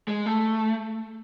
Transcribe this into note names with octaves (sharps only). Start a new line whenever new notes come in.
G#3
A3